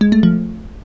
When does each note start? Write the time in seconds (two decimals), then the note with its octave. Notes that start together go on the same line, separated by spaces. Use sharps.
0.01 G#3
0.12 A3
0.23 F3